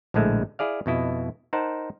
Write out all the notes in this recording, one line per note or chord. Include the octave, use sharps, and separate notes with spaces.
A#1 A2 D3 G#3 A3 E5
E4 G#4 D5 F5
F2 B2 E4 D#5
D#4 A#4 C5 F#5 A5